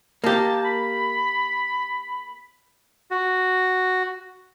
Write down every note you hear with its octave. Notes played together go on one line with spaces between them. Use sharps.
A#3 G4 A5
B5
F#4